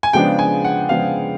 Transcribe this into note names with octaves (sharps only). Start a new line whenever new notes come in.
G#5
C#3 F3 G#3 B3 D4 G5
G#5
F#5
C#3 F3 G#3 B3 D4 F5